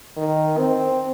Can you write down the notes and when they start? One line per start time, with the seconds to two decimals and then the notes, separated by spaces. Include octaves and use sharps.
0.17 D#3
0.58 C4